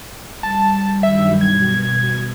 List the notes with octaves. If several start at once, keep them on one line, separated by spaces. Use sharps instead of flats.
G3 A5
G2 D#3 F#3 E5
B2 G#6